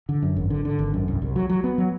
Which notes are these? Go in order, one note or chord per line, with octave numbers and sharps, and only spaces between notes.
D3
F#2
G#1
D3
D3
G#1
F#2
C2
C2
F#3
F#3
B3
F#3